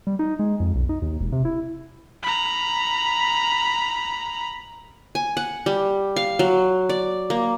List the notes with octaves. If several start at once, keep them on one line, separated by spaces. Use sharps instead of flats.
G3
D#4
G#3
F2
B1
D#4
D#2
E1
C3
E4
A#5 B5
G#5
F#5
G3
F5
F#3
D5
A#3